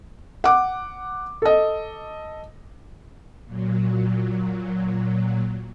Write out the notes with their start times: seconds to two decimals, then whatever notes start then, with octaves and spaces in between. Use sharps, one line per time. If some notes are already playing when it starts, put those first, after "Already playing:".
0.44 F#5 D6
1.42 A4 D#5
3.44 A#2 F#3